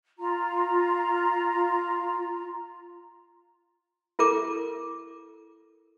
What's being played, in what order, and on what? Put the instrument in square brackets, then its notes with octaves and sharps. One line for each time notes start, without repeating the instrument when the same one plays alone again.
[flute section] F4 A#5
[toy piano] E4 A4 A#4 D6